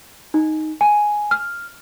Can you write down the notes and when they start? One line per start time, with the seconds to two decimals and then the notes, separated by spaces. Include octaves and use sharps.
0.34 D#4
0.81 G#5
1.31 F6